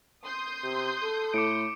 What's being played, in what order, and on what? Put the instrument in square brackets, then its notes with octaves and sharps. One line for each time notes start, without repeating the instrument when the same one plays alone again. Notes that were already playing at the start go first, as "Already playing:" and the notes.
[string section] C6 D#6 G6
[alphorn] C3
A4
[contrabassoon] A2 [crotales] D6 C#7 D7